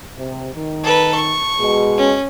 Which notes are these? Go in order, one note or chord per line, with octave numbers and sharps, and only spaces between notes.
C3
D#3
A4 B4
C#6
B2 G#3 G#4
C#4